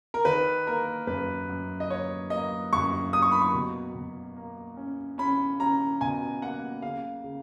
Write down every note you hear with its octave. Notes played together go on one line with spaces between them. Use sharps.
A#4
D#3 B4
A#3 A#4
F#2 B4
F#2
D#5
A#3 C#5
A#3 D#5
F#2 C#6
A#3 D#6
C#6
B5
C#6
B2
B2
A#3
C#4
C#4 B5
C#4 A#5
B2 G#5
A#3 F#5
C#3 F5
C#3